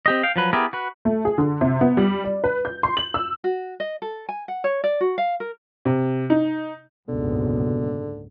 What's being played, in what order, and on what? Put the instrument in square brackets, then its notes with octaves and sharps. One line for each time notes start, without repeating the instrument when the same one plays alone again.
[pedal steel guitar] C4 G4 D#5
F5 G5
F3 F#3 B4
B3 E4 G4 G#4 A#4
F#4 B4
[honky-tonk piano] A3
G#4
D3
C3
B3
G3
D5
B4
G6
C6
F#7
E6
[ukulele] F#4
D#5
A4
G#5
F#5
C#5
D5
F#4
F5
A#4
[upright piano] C3
D#4
[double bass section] F#1 C#2 G#2 [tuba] B2 [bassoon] D3